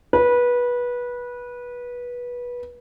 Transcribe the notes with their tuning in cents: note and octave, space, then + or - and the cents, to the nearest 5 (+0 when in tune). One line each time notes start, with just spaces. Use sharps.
B4 -20